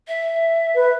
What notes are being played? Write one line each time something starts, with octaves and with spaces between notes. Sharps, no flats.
E5
B4